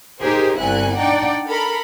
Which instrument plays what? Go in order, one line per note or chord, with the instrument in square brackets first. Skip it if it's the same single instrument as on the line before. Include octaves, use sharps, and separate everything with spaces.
[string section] D#4 G4 G#4 A#4 C5
G1 C2 E4 G#5 F#6
D4 D#4 D5 F#5 G5
A4 A#4 B5